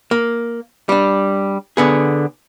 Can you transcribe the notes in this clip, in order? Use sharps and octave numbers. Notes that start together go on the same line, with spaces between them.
A#3
G3 D4
D3 B3 G#4